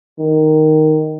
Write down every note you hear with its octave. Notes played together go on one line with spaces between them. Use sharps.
D#3